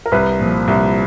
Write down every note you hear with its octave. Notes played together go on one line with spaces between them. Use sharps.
A#4
C2 B4
A#2 F3
C2